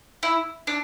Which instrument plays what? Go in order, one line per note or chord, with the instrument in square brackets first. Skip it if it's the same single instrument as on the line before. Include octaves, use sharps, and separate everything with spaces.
[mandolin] E4
D4